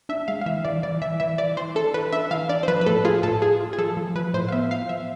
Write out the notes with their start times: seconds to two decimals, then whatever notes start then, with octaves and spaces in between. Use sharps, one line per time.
0.09 D4 E5
0.28 G#3 F5
0.41 F5
0.46 E3 E5
0.65 E3 D5
0.83 E3 D5
1.02 E3 E5
1.20 E3 E5
1.38 E3 D5
1.57 E3 C5
1.75 D4 A4
1.94 E3 B4
2.13 D4 E5
2.31 E3 F5
2.49 D4 D5
2.63 C5
2.68 F3 B4
2.81 B4
2.86 A2 A4
3.05 F4 G#4
3.23 A2 A4
3.42 F4 G#4
3.60 F4
3.73 G#4
3.78 F3 A4
3.97 F3
4.16 F3 B4
4.34 A2 C5
4.48 F5
4.52 B3 E5
4.71 F4 F5
4.89 F3 E5